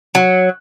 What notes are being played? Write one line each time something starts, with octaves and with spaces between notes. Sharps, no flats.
F#3